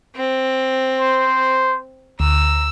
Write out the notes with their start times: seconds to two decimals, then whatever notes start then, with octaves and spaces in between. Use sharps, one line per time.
0.16 C4
1.00 C5
2.20 D2 A#5 E6